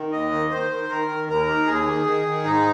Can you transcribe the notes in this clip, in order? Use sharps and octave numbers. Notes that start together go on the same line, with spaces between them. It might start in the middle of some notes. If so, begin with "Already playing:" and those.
Already playing: D#3
D#2 D#5
D#3
D#3 C5
D#3
D#3 A#4
D#3
D#2 A#4
D#3
D#2 G#4
D#3
D#3
D#3
G#2 D#4